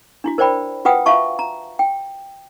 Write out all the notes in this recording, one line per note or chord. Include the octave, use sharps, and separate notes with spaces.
D4 E4 F#4
A#4 C5 D5 G5 B5
F4 F#4 B4 F#5 G5 D#6
F4 F#4 E5 F5 A5 C#6
A#5
G5